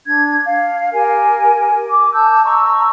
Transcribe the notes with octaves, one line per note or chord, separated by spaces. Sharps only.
D4 G#6
F5
G4 A#4 G#5
D6
A5 E6 G6
D#5 A#5 C#6 E6